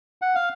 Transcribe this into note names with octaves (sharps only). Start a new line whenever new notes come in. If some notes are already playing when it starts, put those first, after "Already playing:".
F#5
F5